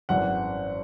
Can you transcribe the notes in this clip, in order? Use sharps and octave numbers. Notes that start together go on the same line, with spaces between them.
G#1 F#2 E3 F#5